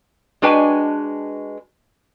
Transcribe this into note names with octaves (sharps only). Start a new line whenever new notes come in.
G#3 D4 F#4 B4 G5 G#5